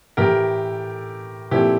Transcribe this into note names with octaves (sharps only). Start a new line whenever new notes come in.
A2 E3 A3 G4 A#4
A#2 F3 A3 C4 E4 G4